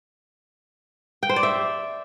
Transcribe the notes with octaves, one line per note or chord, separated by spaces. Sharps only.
G5
C5
D5
E5